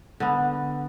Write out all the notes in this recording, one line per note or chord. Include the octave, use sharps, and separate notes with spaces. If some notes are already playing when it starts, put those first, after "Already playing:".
D3 B3